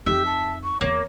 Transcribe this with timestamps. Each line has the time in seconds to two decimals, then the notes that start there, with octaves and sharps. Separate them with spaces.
0.06 F2 D#4 G4 E5
0.26 A5
0.64 C#6
0.81 E2 E3 A#3 C#5